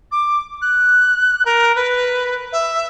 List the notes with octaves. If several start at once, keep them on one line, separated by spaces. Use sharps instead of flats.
D6
F#6
A#4
B4
E5